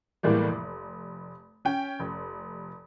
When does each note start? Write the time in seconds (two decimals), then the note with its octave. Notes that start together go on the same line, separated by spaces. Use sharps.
0.23 A2 E3 G3 G#3 A#3
0.48 F1
1.65 C#4 G5
1.99 F1